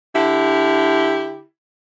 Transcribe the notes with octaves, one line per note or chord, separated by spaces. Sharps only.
D3 E4 G4